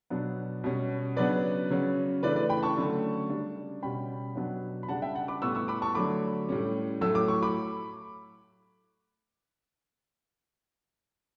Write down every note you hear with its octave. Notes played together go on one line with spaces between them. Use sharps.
B2 F#3 B3 D4
B2 G3 C#4
C#3 F#3 B3 D4 B4 D5
C#3 F#3 C#4
C#3 E3 A3 D4 B4 D5
B4 D5
G5 B5
A5 C#6
D3 F#3 A3 C#4
C#3 G3 D4
B2 G3 C#4 G5 B5
B2 F#3 B3 D4
B5
C#3 G3 D4 F#5 A5
E5 G5
F#5 A5
B5 D6
A2 G3 B3 C#6 E6
C#6 E6
B5 D6
A5 C#6
D3 F#3 A3 B5 D6
A2 G3 C#4
A2 F#3 A3 E6
D6
C#6
B5 D6